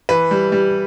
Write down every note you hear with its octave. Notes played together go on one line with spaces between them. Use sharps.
E3 B4
G3
G3